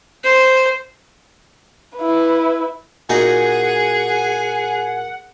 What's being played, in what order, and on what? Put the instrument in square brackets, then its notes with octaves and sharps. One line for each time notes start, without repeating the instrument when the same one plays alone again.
[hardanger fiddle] C5
[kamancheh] E4 B4
[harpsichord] A#2 D#4 F#4 [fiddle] G#4 [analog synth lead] F#5 [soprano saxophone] G#5